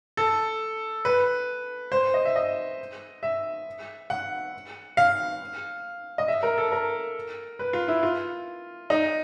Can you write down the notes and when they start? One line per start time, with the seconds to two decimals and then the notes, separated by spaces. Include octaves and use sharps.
0.17 A4
1.05 B4
1.92 C5
2.14 D#5
2.25 E5
2.36 D#5
3.23 E5
4.10 F#5
4.97 F5
6.18 D#5
6.28 E5
6.43 A#4
6.58 A4
6.72 A#4
7.59 B4
7.73 F4
7.88 E4
8.03 F4
8.90 D#4